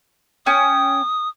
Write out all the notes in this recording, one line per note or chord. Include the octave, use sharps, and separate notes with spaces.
C#4 G5 D#6